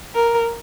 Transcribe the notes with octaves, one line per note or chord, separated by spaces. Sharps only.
A#4